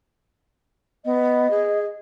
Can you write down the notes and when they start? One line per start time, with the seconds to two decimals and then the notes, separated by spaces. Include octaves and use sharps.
1.05 B3 D#5
1.50 G#4